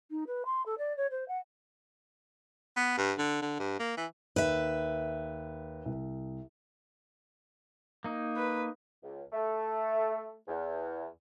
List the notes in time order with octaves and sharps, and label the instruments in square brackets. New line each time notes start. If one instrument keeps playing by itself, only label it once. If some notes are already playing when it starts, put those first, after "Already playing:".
[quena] D#4
B4
C6
A4
D5
C#5
C5
F#5
[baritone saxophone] B3
G2
D3
D3
G2
A#3
E3
[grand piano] D#2 [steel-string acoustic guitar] B4 E5
[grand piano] C2
[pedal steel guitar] A#3 D#4
[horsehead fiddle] B4
[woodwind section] C#2
A3
E2